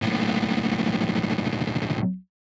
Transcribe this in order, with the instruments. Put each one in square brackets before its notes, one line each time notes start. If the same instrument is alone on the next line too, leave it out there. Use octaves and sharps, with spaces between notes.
[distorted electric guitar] B1 A2